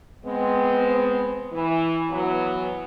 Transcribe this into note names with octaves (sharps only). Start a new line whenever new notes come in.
G#3 B3 C4
E3
E3 F#3 B3